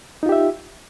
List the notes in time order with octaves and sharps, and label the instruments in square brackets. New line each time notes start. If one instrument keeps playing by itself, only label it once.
[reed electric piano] D#4
F4
G4
E5